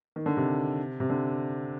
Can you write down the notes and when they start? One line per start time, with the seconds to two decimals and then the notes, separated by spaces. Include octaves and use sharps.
0.16 D#3
0.26 D3
0.37 C3
1.00 C3
1.10 D3